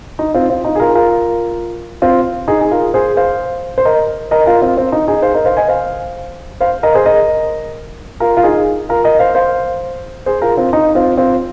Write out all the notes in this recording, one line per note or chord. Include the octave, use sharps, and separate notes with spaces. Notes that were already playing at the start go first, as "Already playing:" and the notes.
D#4
C4 F4
C4 F4
D#4
G#4
F4 A#4
F4 A#4
C4 F4
D#4 G#4
G#4
F4 A#4
G#4 C5
C5 F5
C5
A#4 D#5
A#4 D#5
F4 A#4
C4 F4
C4
D#4
D#4 G#4
C5 F5
A#4 D#5
C5 F5
D#5 G#5
C5 F5
C5 F5
A#4 D#5
G#4 C5
A#4 D#5
F4 A#4
F4
D#4 G#4
F4 A#4
A#4 D#5
C5 F5
C5 F5
G#4 C5
F4 A#4
C4 F4
D#4
C4 F4
C4 F4